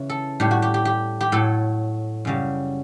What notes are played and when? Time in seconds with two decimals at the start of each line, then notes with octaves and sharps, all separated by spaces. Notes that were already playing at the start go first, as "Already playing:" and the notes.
Already playing: C#3 E3
0.09 A4
0.40 A2 G3 G4
0.51 F#4
0.62 G4
0.74 G4
0.85 G4
1.21 G4
1.32 A2 F#3 A4
2.25 F#2 C#3 G3